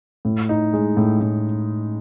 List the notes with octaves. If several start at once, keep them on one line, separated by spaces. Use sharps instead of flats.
A2
D#4
G#3
A2
A2